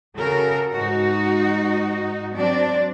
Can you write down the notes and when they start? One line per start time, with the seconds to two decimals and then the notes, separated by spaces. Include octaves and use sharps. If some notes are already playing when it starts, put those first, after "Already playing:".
0.16 C#3 F#4 A4 A#4
0.74 G#2 D#4 F#4
2.35 F#3 C4 D4 D5